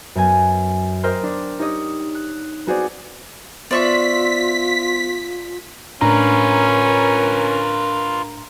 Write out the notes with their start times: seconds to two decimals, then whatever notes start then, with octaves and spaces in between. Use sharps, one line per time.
0.15 F#2 B3 G#5
1.03 A#4 C5 D#5 G5 C6 F6
1.23 D4
1.59 D#4 G4 C#5 D#5 D#6
2.15 F#6
2.67 B3 C4 F#4 G#4 C5 D5
3.71 B3 F4 C5 D5 E5 C6 C#6 B6
6.01 A2 C#4 D4 F4 A#4 B4 A#5